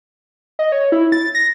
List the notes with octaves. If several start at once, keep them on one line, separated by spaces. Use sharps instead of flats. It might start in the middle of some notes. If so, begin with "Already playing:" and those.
D#5
C#5
E4
A6
A#6